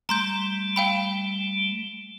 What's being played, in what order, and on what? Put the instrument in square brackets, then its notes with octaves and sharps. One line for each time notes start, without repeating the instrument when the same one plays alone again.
[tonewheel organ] G3 A3 [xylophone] A#5 C6 G6
[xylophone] F5 G5 B5